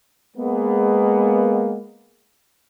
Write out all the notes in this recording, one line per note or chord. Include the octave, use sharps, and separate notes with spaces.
G#3 A#3 B3